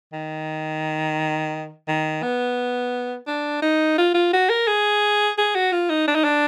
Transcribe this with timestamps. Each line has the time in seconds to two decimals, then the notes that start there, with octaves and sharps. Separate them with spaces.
0.13 D#3
1.88 D#3
2.23 B3
3.27 D4
3.62 D#4
3.98 F4
4.15 F4
4.33 F#4
4.50 A#4
4.67 G#4
5.38 G#4
5.55 F#4
5.72 F4
5.90 D#4
6.07 D4
6.15 D#4
6.24 D4